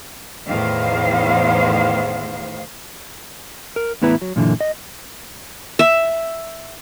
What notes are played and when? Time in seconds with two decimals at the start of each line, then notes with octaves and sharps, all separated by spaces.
0.47 E2 A2 D#3 C5 F5
3.76 A#4
4.02 E2 A2 B3 E4 B4 A#5
4.22 F#3
4.36 F#2 A#2 D3 E3
4.61 D#5
5.79 E5